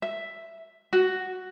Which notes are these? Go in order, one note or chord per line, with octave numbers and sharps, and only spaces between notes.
E5
F#4